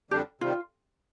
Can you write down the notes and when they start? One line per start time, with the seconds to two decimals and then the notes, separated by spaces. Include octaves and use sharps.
0.11 F2 D3 G3 D4 G4
0.41 C3 D#3 G3 F4